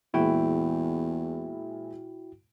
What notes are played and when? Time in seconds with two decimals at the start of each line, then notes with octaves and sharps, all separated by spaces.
0.14 E2 A#2 E3 G#3 E4 F#4 G5